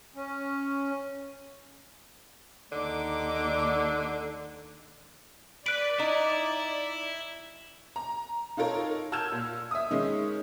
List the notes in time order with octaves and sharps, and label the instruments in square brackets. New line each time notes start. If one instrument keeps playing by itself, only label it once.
[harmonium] C#4
[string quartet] D#2 D#4 D6 [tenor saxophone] D3
[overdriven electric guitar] B4 B5 [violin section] D5 [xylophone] F#6 D7
[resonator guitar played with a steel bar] D#4 [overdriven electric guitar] E4
[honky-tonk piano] A#5
D#4 F4 A4 A#4 C#5
A5 E6 F6 G6 G#6 E7
A#2
E5 D#6
D#3 G#3 C#4